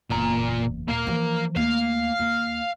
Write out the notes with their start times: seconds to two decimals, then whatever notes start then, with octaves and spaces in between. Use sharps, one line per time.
0.10 F#1 E2 A#2 A#5
0.88 D#2 A#2 A#3 F5
1.07 E3 F3
1.56 D#2 A3 F5
2.19 D#2